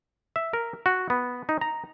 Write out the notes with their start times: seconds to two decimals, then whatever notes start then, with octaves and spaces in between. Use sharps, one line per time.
0.36 E5
0.53 A#4
0.86 F#4
1.10 B3
1.49 D#4
1.61 A#5